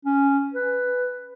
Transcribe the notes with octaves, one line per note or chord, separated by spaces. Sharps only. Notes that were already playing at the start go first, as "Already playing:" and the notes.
C#4
B4